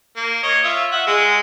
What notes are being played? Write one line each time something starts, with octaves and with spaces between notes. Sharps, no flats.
A#3
C#5 D#5
F4 E5
E5 F#5
G#3